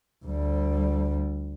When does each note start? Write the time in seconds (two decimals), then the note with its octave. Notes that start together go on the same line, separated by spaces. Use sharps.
0.25 D2 G3